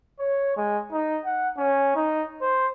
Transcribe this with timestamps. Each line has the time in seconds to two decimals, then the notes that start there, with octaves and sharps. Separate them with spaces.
0.20 C#5
0.57 G#3
0.92 D#4
1.25 F#5
1.57 C#4
1.96 D#4
2.41 C5